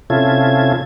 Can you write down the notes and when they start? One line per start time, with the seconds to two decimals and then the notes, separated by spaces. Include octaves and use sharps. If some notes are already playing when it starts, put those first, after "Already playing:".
0.10 C3 C#4 E4 F4 A4 G#6